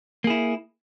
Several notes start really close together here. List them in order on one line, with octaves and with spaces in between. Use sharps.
A#3 G#4 E4